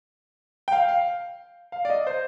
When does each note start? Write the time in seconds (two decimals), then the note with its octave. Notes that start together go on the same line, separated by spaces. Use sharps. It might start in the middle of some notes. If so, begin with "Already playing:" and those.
0.68 G5
0.72 F5
0.88 F5
1.72 F5
1.85 D5
1.90 D#5
2.07 C5